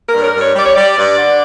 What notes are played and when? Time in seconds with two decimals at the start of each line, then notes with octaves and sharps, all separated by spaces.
0.08 A#4
0.13 G2
0.20 C#5
0.24 A#4
0.35 G2 C#5
0.56 G3 D5
0.64 C#5
0.73 G3 D5
0.97 G2
1.17 D3